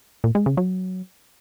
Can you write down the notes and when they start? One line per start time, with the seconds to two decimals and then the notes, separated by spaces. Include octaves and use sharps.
0.24 A#2
0.35 G#3
0.46 C#3
0.57 F#3